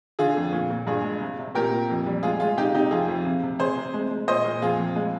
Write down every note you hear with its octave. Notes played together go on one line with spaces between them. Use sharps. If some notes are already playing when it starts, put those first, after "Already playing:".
D3 F4 G#4
F2
A#2
A#2
G2 F4 G#4
G#3
C3
C3
A#2 G4 A#4
A#2
F2
G3
G#3 F4 G#4
G#3 F4 G#4
C3 D#4 G4
C3 D#4 G4
F2 F4 G#4
F2
C3
C3
C3 G#4 C5
C3
G#3
G#3
A#2 C5 D#5
A#2
F2 F4 G#4
F2
G#3